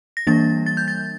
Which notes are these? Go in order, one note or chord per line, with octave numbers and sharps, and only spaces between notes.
A#6
E3 G3 A#3 D4 A6
A6
G6
A6